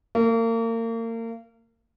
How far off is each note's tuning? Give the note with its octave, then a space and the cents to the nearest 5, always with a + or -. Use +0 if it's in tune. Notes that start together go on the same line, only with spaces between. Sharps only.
A#3 -35